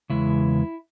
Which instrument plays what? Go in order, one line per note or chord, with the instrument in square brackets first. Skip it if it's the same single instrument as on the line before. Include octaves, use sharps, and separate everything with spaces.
[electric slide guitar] E2 C#3 G#3 E4